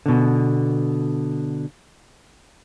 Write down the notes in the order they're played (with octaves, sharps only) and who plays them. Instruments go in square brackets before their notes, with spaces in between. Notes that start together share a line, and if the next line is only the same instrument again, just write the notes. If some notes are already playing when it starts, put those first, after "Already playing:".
[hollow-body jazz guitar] B2 D3